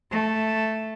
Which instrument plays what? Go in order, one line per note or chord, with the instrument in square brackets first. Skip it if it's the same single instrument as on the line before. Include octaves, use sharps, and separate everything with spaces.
[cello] A3